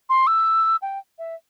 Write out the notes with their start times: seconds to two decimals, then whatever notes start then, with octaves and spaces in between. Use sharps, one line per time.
0.09 C6
0.27 E6
0.82 G5
1.18 E5